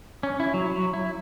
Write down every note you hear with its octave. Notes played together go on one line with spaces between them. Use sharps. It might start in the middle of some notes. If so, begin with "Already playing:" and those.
C#4
E4
F#3
F#3
E4